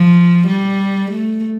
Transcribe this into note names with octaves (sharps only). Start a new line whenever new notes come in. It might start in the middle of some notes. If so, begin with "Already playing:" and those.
Already playing: F3
G3
A3